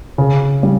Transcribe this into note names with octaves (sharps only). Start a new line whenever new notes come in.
C#3
G3